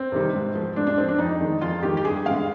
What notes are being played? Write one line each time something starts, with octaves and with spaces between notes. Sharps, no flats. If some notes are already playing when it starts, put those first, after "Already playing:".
Already playing: C4
C3 D#3 G3
G#2
F3 G#3
G#2 D4
D4
F3 G#3 C4
D4
F2 D#4
D#3 G#3
F2 F4
D#3 G#3 G4
G4
G2 G#4
D3 G#3 F5